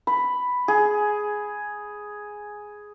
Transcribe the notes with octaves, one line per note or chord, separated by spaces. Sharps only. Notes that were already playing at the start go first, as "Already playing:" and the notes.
B5
G#4